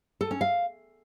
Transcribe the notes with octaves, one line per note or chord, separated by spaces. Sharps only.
A4
C#4
F5